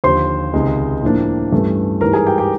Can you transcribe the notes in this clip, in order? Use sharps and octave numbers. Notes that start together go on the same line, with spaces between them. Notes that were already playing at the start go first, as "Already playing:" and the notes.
D#2 D3 F3 C5 C6
C#2 C3 D#3 G#3
A2 F3 A#3 D4
G2 E3 A3 C#4
G#2 E3 G3 A#4 A#5
G#4 G#5
G4 G5
G4 G5